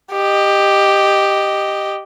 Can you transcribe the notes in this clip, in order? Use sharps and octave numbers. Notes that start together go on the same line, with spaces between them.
G4 D#5